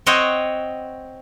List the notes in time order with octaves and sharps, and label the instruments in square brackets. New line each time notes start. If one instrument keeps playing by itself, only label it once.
[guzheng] C4 C5 C#5 D#5 F#5